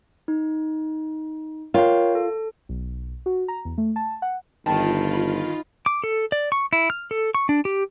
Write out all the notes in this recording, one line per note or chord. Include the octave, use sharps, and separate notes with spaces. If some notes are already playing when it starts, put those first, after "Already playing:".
D#4
F4 A#4 C#5 G5
A4
B1
F#4
A#5
E2
A3
A5
F#5
G1 D#3 F4 A5 B5
B5
D6
A4
D5
C#6
E4
F6
A4
C#6
D4
G4